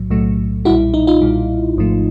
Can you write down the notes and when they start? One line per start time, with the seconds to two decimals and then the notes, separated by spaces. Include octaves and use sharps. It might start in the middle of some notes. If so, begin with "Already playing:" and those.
Already playing: B1 A2 F#3
0.10 B1 A2 F#3 A3
0.65 B1 A#2 G3 E4 F#4
0.94 D#4
1.07 D#4 F4
1.21 B1 A#2 G3
1.77 G#1 G#2 F3 A3